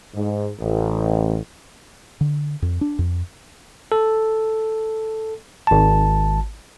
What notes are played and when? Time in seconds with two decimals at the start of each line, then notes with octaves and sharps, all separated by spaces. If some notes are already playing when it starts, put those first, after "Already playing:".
0.14 G#2
0.59 A1
2.21 D3
2.62 F2
2.81 D4
2.99 F2
3.92 A4
5.67 G#1 A5